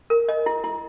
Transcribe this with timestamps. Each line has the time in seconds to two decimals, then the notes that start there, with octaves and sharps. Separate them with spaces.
0.10 A#4
0.29 D#5
0.46 E4
0.64 E4